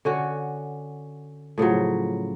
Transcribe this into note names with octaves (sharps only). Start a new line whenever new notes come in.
D3 C#4 F#4
A2 C#3 F3 F#3